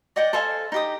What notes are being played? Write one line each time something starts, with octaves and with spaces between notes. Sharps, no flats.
D5 D#5 F#5 G5
A4 C5 F5 G#5
D#4 G4 D#6